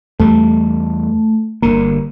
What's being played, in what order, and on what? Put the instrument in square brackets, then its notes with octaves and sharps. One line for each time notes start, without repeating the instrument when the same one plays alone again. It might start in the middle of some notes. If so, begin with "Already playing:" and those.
[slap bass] E2 G3 [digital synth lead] A3
[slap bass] G1 D3 [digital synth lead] A#3